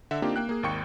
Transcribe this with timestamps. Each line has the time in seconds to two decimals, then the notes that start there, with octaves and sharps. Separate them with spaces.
0.11 D3 E5 F#5
0.22 A#3 C4 D4 D#4 F4 G4
0.36 A#3 G5 F#6
0.49 A#3 G#4
0.63 G#1 D#2 D#3 G5 C#6 C#7